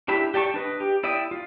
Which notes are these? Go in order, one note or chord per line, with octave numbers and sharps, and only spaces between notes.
D4 E4 G4 E5 B5
G4 D5 A5 C#6
D4 B4 D#5
G4
E4 D5 E5 G5 D#6
F4